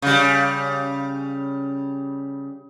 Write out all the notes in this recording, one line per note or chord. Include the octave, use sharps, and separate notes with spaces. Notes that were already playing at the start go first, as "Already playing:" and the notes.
C#3 G3